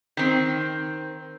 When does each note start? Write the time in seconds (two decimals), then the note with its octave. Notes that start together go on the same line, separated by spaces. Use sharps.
0.17 D#3 C4